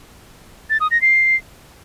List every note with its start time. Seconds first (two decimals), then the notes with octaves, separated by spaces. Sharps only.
0.70 A6
0.81 D#6
0.91 A#6
1.02 C7